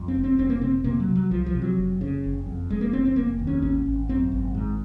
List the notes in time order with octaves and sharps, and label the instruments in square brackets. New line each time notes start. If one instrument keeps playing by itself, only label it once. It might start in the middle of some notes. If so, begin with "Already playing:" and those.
Already playing: [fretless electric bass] F2
C4
F1
C4
F1 C4
A#3
C3 C4
C3 A#3
F#3
C3
F#3
C2 F3
F3
C3
F#3
F#1
C#3
F#1
F2
F1 G#3
A#3
F1 C4
C4
F1 A#3
D#2
C#4
G#1 C#4
G#1
F#2 C4
G#1
G#2